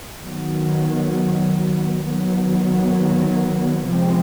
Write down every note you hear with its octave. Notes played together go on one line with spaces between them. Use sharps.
D#3 F#3 B3
D#3 F#3 B3
C3 F3 G#3 C4